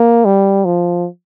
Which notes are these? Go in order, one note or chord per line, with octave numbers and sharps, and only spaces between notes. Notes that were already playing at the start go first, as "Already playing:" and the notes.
Already playing: A#3
G3
F3